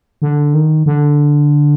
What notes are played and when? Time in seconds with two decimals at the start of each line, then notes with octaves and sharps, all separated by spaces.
0.22 D3
0.54 D#3
0.86 D3